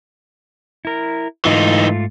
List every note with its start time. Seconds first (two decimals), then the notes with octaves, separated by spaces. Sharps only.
0.85 E4 A#4
1.45 G#2 E3 A3 D#4 F4